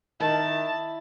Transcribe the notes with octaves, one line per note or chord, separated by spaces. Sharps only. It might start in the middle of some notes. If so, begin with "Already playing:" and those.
D#3 E4 A5